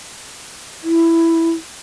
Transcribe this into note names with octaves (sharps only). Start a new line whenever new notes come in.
E4